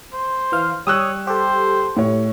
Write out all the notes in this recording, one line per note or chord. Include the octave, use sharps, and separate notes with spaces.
C5
E3 F5
G3 C#5 D#6 E6 F#6
G4 A4 C5
A2 C#5